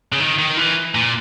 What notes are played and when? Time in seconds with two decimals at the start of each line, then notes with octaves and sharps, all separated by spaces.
0.13 C#3
0.20 D#3
0.39 D#3
0.57 E3
0.95 A#2